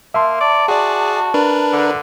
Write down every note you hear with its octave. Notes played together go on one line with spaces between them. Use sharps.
A#3 E5 A5 C6
D5 A5
F#4 G#4 D5
D4 A#4 B4
D3